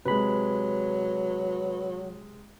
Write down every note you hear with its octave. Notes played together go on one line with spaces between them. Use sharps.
C3 F#3 G#3 B4 B5